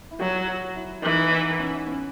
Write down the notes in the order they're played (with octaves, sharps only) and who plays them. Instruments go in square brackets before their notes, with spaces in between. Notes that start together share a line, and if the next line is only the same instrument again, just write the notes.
[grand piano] E4
[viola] F#3 [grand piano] F#4
[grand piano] F#4
E4
[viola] E3 [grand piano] D#4
[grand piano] D#4
C#4
C#4